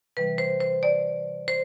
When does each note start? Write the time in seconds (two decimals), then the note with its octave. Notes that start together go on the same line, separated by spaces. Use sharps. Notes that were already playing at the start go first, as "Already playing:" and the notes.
0.17 C3 E3 G3 B4
0.38 C5
0.60 C5
0.83 D5
1.48 C5